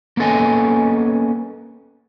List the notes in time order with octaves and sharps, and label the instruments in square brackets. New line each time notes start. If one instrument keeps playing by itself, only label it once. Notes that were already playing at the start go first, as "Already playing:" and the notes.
[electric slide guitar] A#3 B3 C#4 A4 D#5 G#5